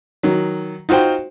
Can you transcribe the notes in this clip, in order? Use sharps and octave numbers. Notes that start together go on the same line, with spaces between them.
D#3 F#3
D#4 F4 F#4 C5 G5